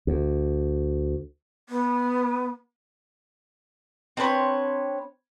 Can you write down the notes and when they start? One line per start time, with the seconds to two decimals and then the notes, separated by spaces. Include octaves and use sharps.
0.07 D2
1.69 B3
4.17 C4 D4 B4 C#5